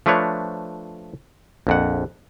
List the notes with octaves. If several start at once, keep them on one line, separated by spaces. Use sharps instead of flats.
F3 A3 D4 B4 C#5
A#1 F2 F#5